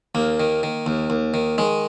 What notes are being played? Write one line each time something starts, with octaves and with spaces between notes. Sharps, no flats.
D#2 A#3
D#3
D#3
D#2
D#2
D#3
D#3 G#3